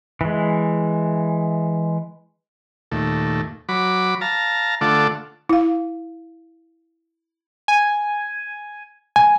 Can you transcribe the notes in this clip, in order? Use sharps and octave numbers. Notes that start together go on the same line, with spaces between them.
E3 G#3
D#2 A#2 A3
F#3 B5 D6
F5 A5 A#5
D3 A3 F4 A4 F#5 D6
E4 F5
G#5
G#5